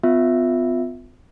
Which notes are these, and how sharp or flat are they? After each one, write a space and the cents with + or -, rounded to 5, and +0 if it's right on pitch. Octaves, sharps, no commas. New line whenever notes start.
B3 +45 F4 +15 E5 +0